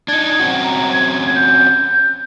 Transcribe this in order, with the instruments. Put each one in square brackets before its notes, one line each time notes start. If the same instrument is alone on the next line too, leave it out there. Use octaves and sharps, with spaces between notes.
[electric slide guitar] D4 D#4 [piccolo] G#6
[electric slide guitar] C4 C#4 F#4
[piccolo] A#5
G#6
G6